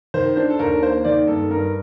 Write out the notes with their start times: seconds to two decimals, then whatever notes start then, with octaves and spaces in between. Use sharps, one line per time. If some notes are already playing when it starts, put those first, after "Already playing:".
0.14 D#3 C5
0.36 D4 C5
0.50 A4
0.59 D#2 A#4
0.82 A#3 C5
1.05 D#3 D5
1.28 G2 A4
1.50 G2 A#4